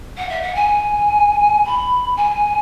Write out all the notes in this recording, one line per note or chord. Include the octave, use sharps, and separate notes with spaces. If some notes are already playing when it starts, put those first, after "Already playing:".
F#5
E5
F#5
G#5
B5
G#5